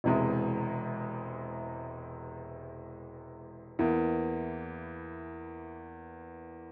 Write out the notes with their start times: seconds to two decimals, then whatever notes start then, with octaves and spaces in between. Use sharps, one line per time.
0.04 E1 E2 C3 E3 G#3
3.79 E2 E3 A#3